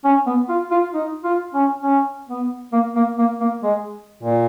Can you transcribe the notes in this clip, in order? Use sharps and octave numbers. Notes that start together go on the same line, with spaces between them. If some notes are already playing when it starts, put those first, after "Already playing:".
C#4
B3
F4
F4
D#4
F4
C#4
C#4
B3
A#3
A#3
A#3
A#3
G#3
A#2